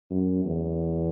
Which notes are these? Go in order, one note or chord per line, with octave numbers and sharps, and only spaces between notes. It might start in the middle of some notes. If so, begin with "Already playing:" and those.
F#2
E2